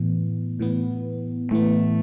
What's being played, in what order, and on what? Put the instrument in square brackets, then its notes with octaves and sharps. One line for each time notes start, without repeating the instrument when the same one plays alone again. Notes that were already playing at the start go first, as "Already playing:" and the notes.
Already playing: [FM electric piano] A2 E3 B3
A2 E3 B3
[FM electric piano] A2 E3 B3 [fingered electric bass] A3